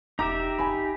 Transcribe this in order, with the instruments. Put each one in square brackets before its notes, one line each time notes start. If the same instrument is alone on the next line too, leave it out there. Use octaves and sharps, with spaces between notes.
[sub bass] E1 [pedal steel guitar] D#4 G4 E5 [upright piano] A#5 D6
[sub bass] F#1 [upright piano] G#5 B5